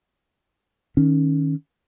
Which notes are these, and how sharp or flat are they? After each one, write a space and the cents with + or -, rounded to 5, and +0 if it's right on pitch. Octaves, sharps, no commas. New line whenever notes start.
D#3 +0 C#4 +0